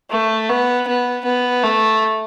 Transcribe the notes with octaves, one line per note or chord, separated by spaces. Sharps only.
A3
B3
B3
B3
A3